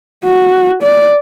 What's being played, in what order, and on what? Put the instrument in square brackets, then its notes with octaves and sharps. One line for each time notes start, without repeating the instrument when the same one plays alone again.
[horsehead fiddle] F#4
D5